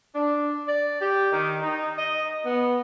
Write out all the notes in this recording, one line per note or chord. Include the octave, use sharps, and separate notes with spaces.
D4
D5
G4
D#3
D#4
D#5
B3